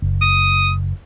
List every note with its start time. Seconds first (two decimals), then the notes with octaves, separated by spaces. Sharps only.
0.02 F#1
0.22 D#6